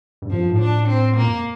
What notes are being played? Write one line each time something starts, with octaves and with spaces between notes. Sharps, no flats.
G2
F2 F3
G2
A2
D4
C4
A#2 A#3
F2